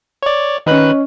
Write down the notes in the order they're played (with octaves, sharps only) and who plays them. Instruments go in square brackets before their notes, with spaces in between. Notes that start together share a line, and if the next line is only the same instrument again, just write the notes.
[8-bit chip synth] C#5 D5
[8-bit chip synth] D#3 B4 F#6 [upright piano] C#4 D#5